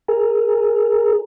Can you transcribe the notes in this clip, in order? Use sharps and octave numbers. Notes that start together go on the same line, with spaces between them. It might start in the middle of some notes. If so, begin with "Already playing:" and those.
G#4 A#4